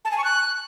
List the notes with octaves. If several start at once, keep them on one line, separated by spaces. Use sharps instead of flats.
A5
G#5
C#6
F#6